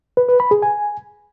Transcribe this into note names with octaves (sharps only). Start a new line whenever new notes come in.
B4
B4
B5
G#4
G#5